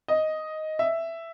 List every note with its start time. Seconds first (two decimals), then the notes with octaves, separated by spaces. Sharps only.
0.08 D#5
0.79 E5